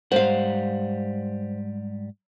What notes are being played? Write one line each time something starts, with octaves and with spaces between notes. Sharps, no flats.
G#2 G3 C5 F5 F#5